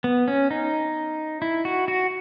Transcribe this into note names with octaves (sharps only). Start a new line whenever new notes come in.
B3
C#4
D#4
E4
F#4
F#4